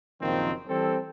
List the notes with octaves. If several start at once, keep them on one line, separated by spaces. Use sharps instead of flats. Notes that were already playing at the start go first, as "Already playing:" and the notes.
F#1 A#2 D#3 F3 C4
E3 G3 C4 A4